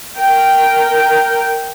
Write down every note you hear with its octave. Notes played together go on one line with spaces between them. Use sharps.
A#4 G5